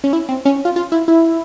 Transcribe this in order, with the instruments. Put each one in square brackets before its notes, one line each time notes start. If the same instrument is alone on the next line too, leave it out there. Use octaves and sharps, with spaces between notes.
[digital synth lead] C#4
E4
C4
C#4
F4
F4
E4
E4